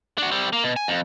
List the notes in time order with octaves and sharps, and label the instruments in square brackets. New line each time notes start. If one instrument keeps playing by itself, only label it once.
[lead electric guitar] D4 F#4
G3 C4
A#3
B2
G#5
F2